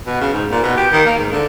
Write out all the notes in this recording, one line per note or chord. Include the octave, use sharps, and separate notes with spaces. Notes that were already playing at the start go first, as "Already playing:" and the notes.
B2
C#3
G#2
A#2
B2
G4
D#3
A#3
G#2
D3